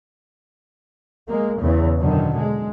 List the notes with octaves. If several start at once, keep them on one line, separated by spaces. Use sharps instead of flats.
G#3 A#3
E2 C#3
F#2 B2 D3 D#3
G#3